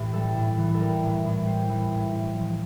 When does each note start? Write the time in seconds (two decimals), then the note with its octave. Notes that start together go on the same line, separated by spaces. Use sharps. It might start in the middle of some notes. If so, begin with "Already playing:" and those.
Already playing: A2 E3 G4
0.13 G3 A4
0.36 A2
0.58 E3
0.74 A4
0.80 G3 A#4
1.03 A2
1.25 A2
1.47 G3 C5
1.69 E3
1.91 A2
2.13 A2
2.35 F3